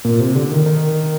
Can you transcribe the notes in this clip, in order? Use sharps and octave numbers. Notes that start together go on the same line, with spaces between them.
A#2
C3
D3
D#3
D#3